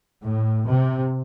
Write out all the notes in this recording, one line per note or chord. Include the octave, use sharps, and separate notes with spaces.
A2
C3